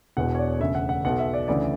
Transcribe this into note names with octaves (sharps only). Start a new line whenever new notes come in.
E1 E2 B2 F#5
C#5
D5
E1 D2 C#3 E5
F#5
F#5
B1 B2 F#5
E5
D5
D2 C#3 E3 D5